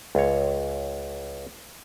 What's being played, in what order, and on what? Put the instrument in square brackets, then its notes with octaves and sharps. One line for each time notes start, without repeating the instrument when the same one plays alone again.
[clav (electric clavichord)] C#2 C#5